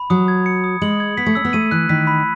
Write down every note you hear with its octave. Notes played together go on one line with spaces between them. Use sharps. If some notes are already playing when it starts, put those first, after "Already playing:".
Already playing: B5
F#3 D#6
G#6
C#7
D#6
G#3 F#7
G#6
B3 B6
A3
C#4 E6
B3
A3 D#7
E3 F#6
D#3 B6
B5